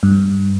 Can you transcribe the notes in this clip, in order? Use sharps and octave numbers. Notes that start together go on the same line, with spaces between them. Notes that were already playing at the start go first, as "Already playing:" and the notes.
G2